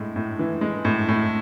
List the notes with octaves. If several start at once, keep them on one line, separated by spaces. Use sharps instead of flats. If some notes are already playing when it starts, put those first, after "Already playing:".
Already playing: A2 G#3
A2
E3
G#3
A2
A2